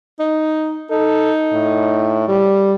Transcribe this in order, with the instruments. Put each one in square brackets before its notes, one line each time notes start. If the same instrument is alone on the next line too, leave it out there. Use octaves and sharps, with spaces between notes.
[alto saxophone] D#4
[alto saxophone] D#4 [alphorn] A4
[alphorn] A2
G3